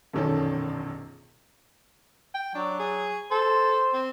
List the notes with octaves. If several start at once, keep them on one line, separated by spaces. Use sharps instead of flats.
E1 A#1 F#2 D#3 C#4 A4
G5
F#3 D4
G#4
A4 C5
C4